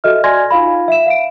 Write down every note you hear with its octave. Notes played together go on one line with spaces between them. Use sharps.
F#4 A4 D#5 E5 F6
D5 G#5 C6 G#6 A#6
D#4 F4 F5 B5
E5 E7
F5 D7